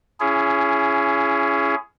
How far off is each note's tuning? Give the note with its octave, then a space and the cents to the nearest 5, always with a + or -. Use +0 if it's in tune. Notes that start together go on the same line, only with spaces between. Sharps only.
C#4 +15 E4 +40 G#4 +0